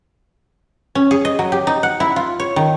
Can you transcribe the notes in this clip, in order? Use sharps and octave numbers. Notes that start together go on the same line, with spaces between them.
C#4
G#4
D#5
F#3
G4
D#4
F#5
E4
F4
C#5
D#3